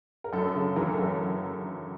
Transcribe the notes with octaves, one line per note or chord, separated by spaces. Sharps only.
A#4
F#2 A4
C#3
E3 A#4
A4
F#2 A#4